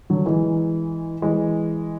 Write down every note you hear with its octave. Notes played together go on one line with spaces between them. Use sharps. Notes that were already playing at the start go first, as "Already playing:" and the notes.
D3 F#3
E3 G#3
E3 G#3